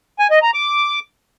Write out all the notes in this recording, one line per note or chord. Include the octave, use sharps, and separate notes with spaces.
G#5
D#5
A#5
D6